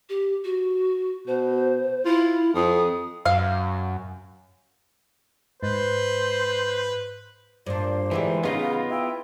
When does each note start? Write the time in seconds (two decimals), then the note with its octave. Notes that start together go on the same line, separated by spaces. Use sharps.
0.09 G4
0.44 F#4
1.27 B2 C5
2.05 E4 F4
2.55 F2 D#6
3.25 F#2 F5
5.63 G#2 B4 C5
7.67 G2 A#2 D4 C5
8.11 D3 E3 G#3 G4
8.43 C#3 B3 D#4 F4 G#4 D#5 F5
8.90 E4 G5